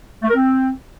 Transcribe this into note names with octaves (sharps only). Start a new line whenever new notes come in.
A3
A#4
C4